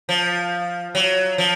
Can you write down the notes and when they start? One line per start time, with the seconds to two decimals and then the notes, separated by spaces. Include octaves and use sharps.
0.09 F3
0.95 F#3
1.38 F3